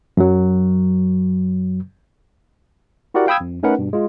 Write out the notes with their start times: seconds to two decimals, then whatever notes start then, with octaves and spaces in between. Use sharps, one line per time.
0.17 F#2 F#3
3.14 E4 F#4 G4 A#4 D5 F#5
3.27 F5 G5 B5 D#6 E6 G#6
3.40 F2
3.63 A3 C#4 D#4 A#4 B4 F#5
3.79 G2 B2
3.93 G#3 F4